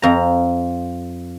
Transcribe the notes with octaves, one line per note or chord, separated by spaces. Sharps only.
F2 A#5